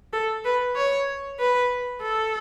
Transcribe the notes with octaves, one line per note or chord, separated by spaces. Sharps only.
A4
B4
C#5
B4
A4